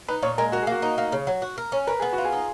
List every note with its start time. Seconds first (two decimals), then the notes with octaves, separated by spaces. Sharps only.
0.08 D#4 B4
0.22 A#2 C#5
0.38 G#3 A#4
0.52 F#4 A#4
0.62 G#4
0.67 A#3 F#4
0.82 D#4
0.98 A#3
1.12 C#3
1.27 F#3
1.42 F#4
1.58 A#4
1.72 C#4
1.87 A#4 B4
2.00 B3 G#4
2.13 F#4
2.18 F4
2.25 G#4
2.32 D#4